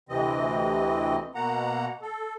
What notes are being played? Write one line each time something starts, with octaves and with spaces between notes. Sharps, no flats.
D2 C3 E3 C4 D#5
B2 A#3 F#5 A#5
A4